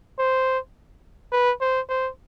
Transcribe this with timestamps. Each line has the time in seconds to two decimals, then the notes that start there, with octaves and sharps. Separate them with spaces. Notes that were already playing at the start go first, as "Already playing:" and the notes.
0.19 C5
1.32 B4
1.61 C5
1.89 C5